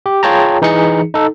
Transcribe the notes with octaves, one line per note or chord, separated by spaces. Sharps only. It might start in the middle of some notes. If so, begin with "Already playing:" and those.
G4
F4 G#4 C#5 G5 A5 A#5
E3 D#4 G#4 C#7
D#4 A4